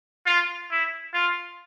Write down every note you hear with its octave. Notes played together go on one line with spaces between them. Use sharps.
F4
E4
F4